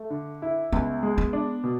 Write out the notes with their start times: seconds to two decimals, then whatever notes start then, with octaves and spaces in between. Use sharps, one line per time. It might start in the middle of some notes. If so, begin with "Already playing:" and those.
Already playing: A3
0.10 D3
0.42 E4
0.72 C#2 B3
1.03 G#3
1.18 B3
1.33 D4
1.64 B2